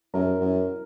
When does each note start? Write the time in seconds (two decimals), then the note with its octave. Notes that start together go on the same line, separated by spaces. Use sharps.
0.14 F#2 A#4
0.40 F#2